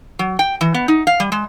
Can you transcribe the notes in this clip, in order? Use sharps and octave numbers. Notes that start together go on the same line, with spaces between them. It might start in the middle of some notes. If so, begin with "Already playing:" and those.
F#3
G5
E3
B3
D#4
F5
G3
G#3